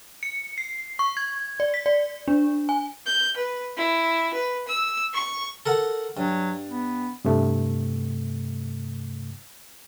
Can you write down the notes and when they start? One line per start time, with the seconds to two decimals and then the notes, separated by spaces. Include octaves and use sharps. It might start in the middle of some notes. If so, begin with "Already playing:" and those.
0.23 C#7
0.58 C7
0.99 C#6
1.17 G#6
1.60 D5
1.74 B6
1.86 D5
2.28 D4
2.69 G#5
3.06 G6
3.37 B4
3.77 E4
4.33 B4
4.68 E6
5.14 C#6
5.66 A4 A#4 F#5
6.17 G2 F#3
6.70 B3
7.25 G2 C3 A3